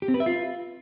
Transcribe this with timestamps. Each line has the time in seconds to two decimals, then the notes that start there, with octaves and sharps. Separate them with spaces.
0.02 G4
0.08 C4
0.14 B4
0.20 E5
0.26 F4